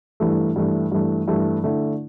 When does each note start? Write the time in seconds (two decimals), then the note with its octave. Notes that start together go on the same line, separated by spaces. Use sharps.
0.20 G2 E3 A3
0.56 G2 E3 A3
0.92 G2 E3 A3
1.28 G2 E3 A3
1.64 D3 A3 E4